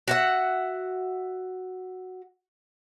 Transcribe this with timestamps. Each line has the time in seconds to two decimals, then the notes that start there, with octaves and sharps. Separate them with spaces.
0.08 F#4 E5 F#5